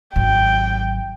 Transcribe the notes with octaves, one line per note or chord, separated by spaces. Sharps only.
G#1 F#3 G5